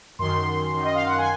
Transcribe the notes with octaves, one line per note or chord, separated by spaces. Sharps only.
F#2 D#3 C6
F#2 D#3
D#5
F5
F#5
G#5